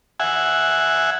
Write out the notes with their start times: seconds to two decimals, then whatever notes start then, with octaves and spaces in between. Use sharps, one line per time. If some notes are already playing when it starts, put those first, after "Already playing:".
0.20 E5 F#5 G#5